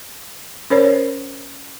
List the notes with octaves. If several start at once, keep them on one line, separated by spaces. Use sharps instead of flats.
C#4 A#4 C5 C#5